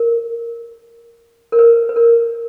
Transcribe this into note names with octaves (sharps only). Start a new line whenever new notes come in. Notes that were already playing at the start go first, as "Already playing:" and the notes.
Already playing: A#4
A#4
B4
B4
A#4